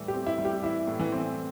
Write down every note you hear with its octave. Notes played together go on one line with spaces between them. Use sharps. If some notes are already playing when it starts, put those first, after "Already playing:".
Already playing: A2 E3 G3
G4
C4
E4
G3
G4
E3 E4
A2
E3
C4